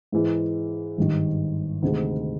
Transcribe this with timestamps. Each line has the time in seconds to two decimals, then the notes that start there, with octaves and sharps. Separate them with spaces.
0.12 G#2 E3 G#3
0.97 G#1 G2 D#3
1.82 D2 C3 D#3 G#3